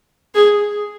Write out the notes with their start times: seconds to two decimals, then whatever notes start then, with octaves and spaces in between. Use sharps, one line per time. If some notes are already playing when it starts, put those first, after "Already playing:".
0.35 G#4